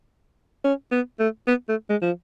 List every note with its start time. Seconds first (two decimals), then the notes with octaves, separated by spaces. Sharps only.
0.64 C#4
0.92 B3
1.19 A3
1.47 B3
1.69 A3
1.90 G#3
2.02 F3